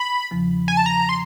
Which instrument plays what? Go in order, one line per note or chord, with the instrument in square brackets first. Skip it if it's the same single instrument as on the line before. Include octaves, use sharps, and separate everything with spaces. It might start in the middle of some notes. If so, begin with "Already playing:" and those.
Already playing: [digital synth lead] B5
[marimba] E2 C#3 F3
[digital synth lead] G#5
A5
A#5
C6